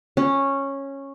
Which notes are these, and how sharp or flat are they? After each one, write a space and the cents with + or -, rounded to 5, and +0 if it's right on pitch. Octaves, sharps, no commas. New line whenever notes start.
C#4 -10